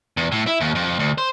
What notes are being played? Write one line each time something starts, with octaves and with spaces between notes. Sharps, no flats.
E2
A2
E4
D#2
F2
D2
C5